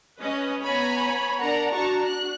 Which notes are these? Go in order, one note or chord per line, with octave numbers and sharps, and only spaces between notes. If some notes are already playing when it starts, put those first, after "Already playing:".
C#4 B4 D#5
B3 C#5 G#5 A#5 B5
D4 A#4 F#5 A#5
D4 F#4 A5 A#5 C#6
F#6